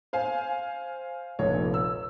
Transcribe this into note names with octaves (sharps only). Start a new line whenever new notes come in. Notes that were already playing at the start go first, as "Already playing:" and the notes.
C5 F5 G#5
F1 A#1 C#5
E6